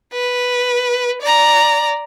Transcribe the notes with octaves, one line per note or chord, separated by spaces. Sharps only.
B4
D5 A#5